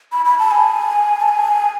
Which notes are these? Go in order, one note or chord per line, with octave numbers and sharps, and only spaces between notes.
B5
B5
A5
G#5
A5
G#5